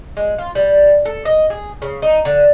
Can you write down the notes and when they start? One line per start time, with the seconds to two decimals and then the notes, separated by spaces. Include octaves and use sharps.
0.17 G#3
0.38 F4
0.55 G3
1.05 A4
1.25 D#5
1.50 G#4
1.82 C#3
2.02 D#4
2.25 D3